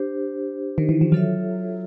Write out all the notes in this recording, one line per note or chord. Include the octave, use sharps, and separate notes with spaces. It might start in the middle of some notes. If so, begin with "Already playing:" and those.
Already playing: D4 G4 C5
D#3
E3
F3
F#3 F4 A4 C#5 E5